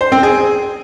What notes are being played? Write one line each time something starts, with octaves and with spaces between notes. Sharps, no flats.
C5
C4
G#4